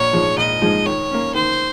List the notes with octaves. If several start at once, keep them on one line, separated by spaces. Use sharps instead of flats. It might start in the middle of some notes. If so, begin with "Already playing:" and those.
Already playing: A#1 C#5
G#2 F3 G#3
A#1 D#5
G#2 F3 G#3
D#3 C#5
A#3 C#4
D#3 C5